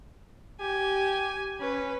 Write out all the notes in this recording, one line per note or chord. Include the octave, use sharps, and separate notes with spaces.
G4 G#5
C#4 B4